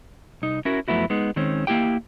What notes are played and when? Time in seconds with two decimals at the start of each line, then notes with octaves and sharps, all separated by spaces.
0.42 C2 D#4
0.65 C#4 E4 F#4 A#4
0.88 F#2 F3 A3 B3 E4 F#4
1.10 G#3 B3 D#4
1.36 D#3 G#3 C4 C#4
1.67 A#3 C#4 E4 G4 G5